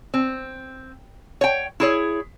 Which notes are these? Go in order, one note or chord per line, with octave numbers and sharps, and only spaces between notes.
C4
C#5 G5
E4 G#4 C#5